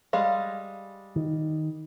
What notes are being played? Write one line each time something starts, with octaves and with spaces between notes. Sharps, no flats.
G3 G#3 F5
D#3